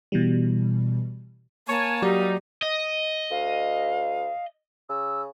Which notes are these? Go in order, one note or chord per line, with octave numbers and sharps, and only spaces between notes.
B2 E3 G3
A#3 C#5 G#5 A5
F#3 G3 D#4 F#4 G4 D5
D#5
D2 F5
C#3 E6